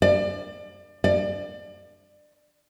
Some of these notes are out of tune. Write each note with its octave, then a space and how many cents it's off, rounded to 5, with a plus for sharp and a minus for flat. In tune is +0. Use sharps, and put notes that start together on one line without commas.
D5 +30
D5 +30